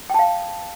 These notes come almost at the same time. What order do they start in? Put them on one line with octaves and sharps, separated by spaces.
G5 A5 F5